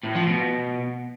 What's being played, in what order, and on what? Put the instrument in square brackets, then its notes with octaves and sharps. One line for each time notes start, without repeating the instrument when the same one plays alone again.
[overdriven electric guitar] A2
F3
B2